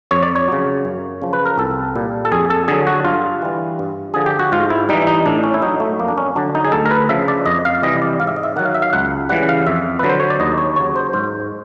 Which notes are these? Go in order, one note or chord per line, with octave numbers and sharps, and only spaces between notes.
F2 C#5
D5
C#5
C#3 F#3
F#2
C#3 F3
B4
A#4
C2 A4
A#2 G3
A4
F2 G#4
A4
D3 F#3 G#4
F#4
G2 F4
E3 G3
G2
D3 F3 G#4
G4
F#4
G#2 F4
E4
E3 G3 D#4
E4
D#4
A2 D4
C#4
E4
F#3 D#4
A3
F2 A#3
D4
C#4
D3 F#3 D4
D#4
G#4
D2 A4
A#4
B4
C#3 F3 E5
D5
F2 D#5
F5
C3 E3 G3 D#5
D5
G#2 F5
E5
D#5
E5
D#3 F#3 F#5
F5
E5
F5
C#2 F#5
C#3 E3 G3 F#5
F5
F2 E5
D3 F#3 B4
C5
C#5
D5
D#2 D#5
C#5
C#3 F#3 C#5
C5
G#2 C5